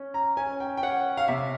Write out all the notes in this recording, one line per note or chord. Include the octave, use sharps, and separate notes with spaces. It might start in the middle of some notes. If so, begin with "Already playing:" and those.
Already playing: C#4
A#5
C#4 G#5
G5
G5
C#4 F#5
F5
C3 E5